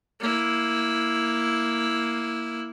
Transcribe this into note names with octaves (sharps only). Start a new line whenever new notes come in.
A#3 E4